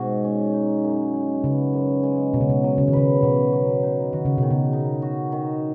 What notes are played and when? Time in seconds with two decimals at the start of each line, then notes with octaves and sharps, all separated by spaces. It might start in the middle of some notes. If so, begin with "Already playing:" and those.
Already playing: G#2 B2 F#4
0.24 C#4
0.54 D#4
0.84 F#2
1.14 G#3
1.44 C#3 B3
1.73 F#2
2.03 G#3
2.33 B2 F#3
2.41 C#3
2.49 B2
2.64 F#3
2.78 C#3
2.88 D#3
2.93 C#3 B4
3.23 B2 F#3
3.53 F#3
3.83 D#4
4.13 D#3 F#4
4.25 C#3
4.38 B2 D#3
4.51 C#3
4.73 D#4
5.02 F#4
5.32 D#3